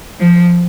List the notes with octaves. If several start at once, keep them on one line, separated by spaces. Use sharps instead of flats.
F3